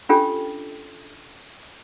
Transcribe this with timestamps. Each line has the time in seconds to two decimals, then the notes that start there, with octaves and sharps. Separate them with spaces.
0.09 C#4 D4 F4 G4 A4 G5